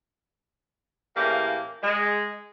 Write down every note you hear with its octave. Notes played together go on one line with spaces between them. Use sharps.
A2 C#3 E3 A#3 G4 F5
G#3